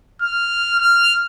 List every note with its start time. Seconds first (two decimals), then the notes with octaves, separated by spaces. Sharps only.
0.22 F6
0.79 F6